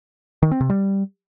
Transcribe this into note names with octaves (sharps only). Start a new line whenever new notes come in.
D#3
C4
C3
G3